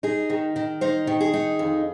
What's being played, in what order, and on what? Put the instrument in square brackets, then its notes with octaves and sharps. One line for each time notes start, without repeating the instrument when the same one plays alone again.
[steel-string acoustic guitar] D#4 G#4
D#3
D#3
D#4 C5
D#3
G#4
D#4
F2